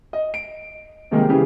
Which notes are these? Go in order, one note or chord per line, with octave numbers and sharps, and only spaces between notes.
D#5
D7
C3 D#3 G3 G#3 A#3 D#4
C#3 E3 G4 G#4